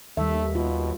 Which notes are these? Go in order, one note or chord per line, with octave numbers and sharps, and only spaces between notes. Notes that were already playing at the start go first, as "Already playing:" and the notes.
D#2 G3 A3 E5
B2 F4